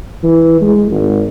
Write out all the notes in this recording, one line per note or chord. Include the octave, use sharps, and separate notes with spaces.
E3
G#3
G#1